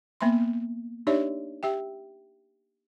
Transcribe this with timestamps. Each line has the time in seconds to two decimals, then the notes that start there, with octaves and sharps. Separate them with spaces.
0.21 A#3 B3 E5 B5 C6
1.07 D4 D#4 G4 C#5 D5 E5
1.63 G4 E5 G5